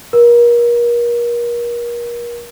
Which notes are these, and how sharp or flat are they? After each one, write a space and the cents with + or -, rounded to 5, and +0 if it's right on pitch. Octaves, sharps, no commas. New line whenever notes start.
A#4 +35